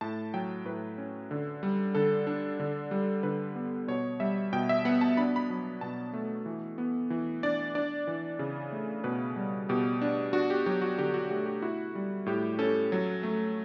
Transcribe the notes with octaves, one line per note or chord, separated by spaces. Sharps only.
A2 A5
F#3 G5
A2 B4
C#4
D3
G3
D3 A4
D4
D3
G3
D3 B4
B3
B2 C#5
G3 E5
B2 G5
E5
B3 F#5
A5
D4 B5
B5
F#3
B2 A5
A3
E3
B3
E3
D4 D5
D4 D5
E3
C#3
A3
B2 B4
G3
B2 G4
D4
D4 F#4
G4
F#3 G4
F#4
D3 G4
F#4
A3 G4
G4
E4 F#4
G3
A2 G4
C#4 A4
F#3
A3